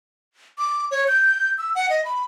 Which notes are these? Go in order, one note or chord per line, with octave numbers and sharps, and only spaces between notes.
D6
C#5
G6
E6
F#5
D#5
B5